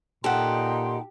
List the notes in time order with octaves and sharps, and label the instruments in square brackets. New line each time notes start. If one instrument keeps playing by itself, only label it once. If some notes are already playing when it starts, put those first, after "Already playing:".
[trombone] A#2 [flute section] D#4 G5 C6 [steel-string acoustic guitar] G4 [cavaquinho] A4 F#5